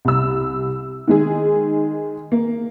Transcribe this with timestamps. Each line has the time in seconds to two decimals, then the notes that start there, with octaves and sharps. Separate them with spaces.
0.05 C2 E6
1.07 D#3 G#3 G#4
2.32 A#3